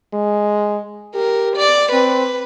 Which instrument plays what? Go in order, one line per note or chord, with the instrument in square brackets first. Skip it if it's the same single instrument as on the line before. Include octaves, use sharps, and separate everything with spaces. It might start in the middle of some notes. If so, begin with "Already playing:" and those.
[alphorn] G#3
[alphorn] G4 [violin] A#4
[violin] D5
[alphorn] C4 [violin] B4